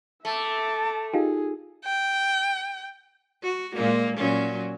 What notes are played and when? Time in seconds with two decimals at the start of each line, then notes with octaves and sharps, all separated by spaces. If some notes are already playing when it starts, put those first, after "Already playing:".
0.25 A3 E5 A5 D6
1.14 D#4 F4 G4 G#4
1.85 G5
3.43 F#4
3.75 A#2 G#3 A#3
4.17 A#2 F#3 C#4